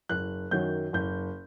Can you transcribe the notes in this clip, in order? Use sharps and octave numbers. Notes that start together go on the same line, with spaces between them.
F#1 F#6
F#2 D#3 F#3 G6
F#1 G6